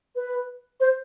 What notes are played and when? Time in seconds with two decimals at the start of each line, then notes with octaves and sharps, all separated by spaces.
0.16 B4
0.80 C5